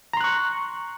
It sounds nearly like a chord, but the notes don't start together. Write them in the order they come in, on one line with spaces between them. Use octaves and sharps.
A#5 C6 F#6 C#6